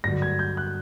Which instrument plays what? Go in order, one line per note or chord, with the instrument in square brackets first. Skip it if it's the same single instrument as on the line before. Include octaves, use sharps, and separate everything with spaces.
[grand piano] G2 D3 F#3 A#6
G#6
G6
F#6